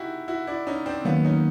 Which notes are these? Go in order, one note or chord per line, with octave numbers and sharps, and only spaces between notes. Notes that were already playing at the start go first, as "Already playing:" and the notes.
Already playing: D#4 E4 F#4 G4
E4 F#4
D4 E4
C#4 D#4
C4 D4
D#3 F#3 A#3 B3 C#4
C#4 D#4